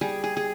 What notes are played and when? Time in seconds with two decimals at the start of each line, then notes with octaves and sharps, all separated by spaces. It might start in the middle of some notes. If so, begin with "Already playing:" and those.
0.01 G3 G#4
0.24 G#4
0.37 G#4